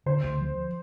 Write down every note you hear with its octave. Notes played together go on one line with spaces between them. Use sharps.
D3 C5
D2
F3